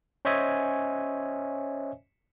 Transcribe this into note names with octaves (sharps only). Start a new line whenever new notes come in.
C#4 C5 C#5 D#5 E5 G#5